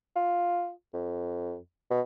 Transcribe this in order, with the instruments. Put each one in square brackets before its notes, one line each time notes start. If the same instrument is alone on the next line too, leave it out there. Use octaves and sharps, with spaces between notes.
[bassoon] F4
F2
B2